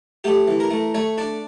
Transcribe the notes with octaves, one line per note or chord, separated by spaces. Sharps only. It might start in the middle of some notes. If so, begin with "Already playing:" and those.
A3 G4
E3
A#4
A3
A3 C#5
D4 D5